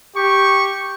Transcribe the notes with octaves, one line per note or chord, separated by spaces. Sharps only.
G4 C#6